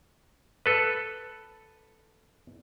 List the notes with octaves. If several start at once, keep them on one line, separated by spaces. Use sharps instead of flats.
A4 B4